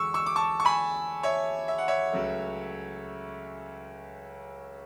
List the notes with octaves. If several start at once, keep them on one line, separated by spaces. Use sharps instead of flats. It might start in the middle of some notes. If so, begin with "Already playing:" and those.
Already playing: E2 D3 G#3 C#6 E6
C#6 E6
D6
A5 C#6
C#6
G#5 B5
C#5 E5
E5
F#5
C#5 E5
C#2 C#3 F#3 A3